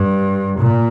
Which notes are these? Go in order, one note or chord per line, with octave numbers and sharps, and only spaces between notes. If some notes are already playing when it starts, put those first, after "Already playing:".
Already playing: G2
A#2